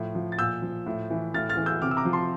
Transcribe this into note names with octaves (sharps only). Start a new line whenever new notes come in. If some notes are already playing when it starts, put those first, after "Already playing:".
Already playing: A2 F3
F3
A6
A#2 E6 G6
F3
A2
E3
A2 F6 A6
F6 A6
E3
E6 G6
C3 D6 F6
E6
A#5 D6
F3
A5 C6